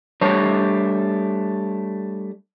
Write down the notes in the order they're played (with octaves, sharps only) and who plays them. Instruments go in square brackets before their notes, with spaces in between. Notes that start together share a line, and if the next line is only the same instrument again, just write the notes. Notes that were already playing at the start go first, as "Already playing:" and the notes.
[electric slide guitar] G3 A3 D4 C5 C#5